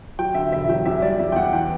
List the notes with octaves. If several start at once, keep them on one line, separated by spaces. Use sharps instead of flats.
F#3 G5
D3 E5
E1 E5
F#3 G5
E2 E5
G3 D5
E2 E5
G5
E2 F#5
E3 G5